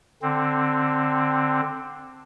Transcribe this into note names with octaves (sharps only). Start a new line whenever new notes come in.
D3 C4